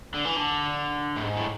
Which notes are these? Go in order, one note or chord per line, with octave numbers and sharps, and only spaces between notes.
D3
E3
D3
A2
G#2
A2